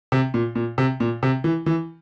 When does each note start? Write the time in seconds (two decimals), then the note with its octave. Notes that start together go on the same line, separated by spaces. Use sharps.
0.12 C3
0.34 A#2
0.55 A#2
0.78 C3
1.00 A#2
1.23 C3
1.44 E3
1.66 E3